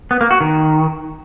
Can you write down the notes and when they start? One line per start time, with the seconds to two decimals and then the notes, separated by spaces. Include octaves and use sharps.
0.11 B3
0.21 A#3
0.31 F#4
0.41 D#3